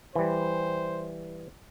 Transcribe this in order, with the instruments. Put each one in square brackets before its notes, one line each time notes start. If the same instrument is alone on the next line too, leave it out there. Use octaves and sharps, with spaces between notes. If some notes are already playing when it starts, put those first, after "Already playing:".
[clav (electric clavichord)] E3 G3 [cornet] C5